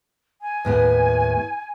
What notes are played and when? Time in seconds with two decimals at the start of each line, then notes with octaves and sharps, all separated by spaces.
0.41 G#5
0.65 D#2 A2 B3